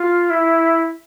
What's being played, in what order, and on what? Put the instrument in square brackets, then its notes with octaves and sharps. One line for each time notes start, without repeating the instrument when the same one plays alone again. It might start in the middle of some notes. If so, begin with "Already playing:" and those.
Already playing: [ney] F4
E4